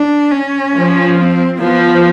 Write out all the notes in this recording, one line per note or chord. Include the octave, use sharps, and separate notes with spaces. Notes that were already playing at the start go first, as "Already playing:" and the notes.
Already playing: D4
C#4
F3
C4
F3 B3